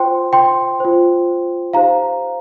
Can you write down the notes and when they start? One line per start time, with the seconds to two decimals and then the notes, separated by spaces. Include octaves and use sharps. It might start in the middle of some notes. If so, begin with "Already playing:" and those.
Already playing: F4 C5 G5 C6
0.33 G5 C6
0.80 F4 C5
1.73 D#4 G4 C5 F5 A#5